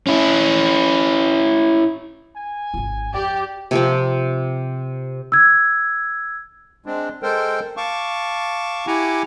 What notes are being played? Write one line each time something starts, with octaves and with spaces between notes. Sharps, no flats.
C#4 E4
G#5
G#1 F4
F2 G4 D5
C3 F3 C4
E6 G#6
G#3 C4 D4
G#3 A4 A#4 C5 G5
F5 A5 C#6 D6
E4 G4 F#5 G#5 A#5 D6